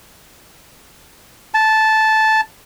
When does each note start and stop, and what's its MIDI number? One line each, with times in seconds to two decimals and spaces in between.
1.54 2.41 81